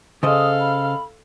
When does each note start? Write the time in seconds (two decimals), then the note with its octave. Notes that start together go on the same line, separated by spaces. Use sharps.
0.23 C#3 A4 C5 D#5 F5 D#6
0.59 B5